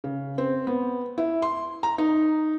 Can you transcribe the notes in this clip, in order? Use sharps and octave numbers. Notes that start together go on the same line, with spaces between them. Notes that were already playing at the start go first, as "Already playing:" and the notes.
C#3
C4
B3
E4
C6
A#5
D#4